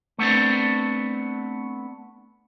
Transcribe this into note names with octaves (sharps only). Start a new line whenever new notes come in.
A3 B3 C4 D4